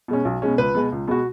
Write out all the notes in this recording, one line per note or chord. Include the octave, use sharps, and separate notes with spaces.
B2 G#3 C#4
B1
B2 G#3 C#4
C#2 B4
B2 G#3 B3
C#2
B2 G#3 B3 F#4